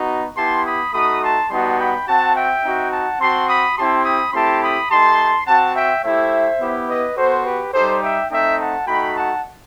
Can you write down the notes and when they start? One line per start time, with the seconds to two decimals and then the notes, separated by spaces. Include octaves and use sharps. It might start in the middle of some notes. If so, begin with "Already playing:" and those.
Already playing: B3 D#4 F#4
0.37 B3 E4 G4 A5 C6
0.65 B5 D#6
0.93 A3 D#4 F#4 B5 D#6
1.22 A5 C6
1.50 G3 B3 D#4 F#4 A5 C6
1.78 G5 B5
2.07 C4 F#4 F#5 A5
2.35 E5 G5
2.63 C4 D#4 F#4
2.91 F#5 A5
3.20 C4 F#4 A5 C6
3.49 B5 D#6
3.77 C4 E4 G4 A5 C6
4.05 B5 D#6
4.33 A3 C4 E4 G4 A5 C6
4.62 B5 D#6
4.90 A3 D#4 G4 A5 C6
5.47 C4 F#4 F#5 A5
5.75 E5 G5
6.04 A3 E4 G4 C5 E5
6.61 B3 E4 G4
6.89 B4 D#5
7.17 B3 F#4 A4 C5
7.45 G4 B4
7.74 G3 D#4 G4 A4 C5
8.02 E5 G5
8.30 A3 C4 D#4 E5 G5
8.59 F#5 A5
8.87 A3 D#4 F#4 G5 B5
9.15 F#5 A5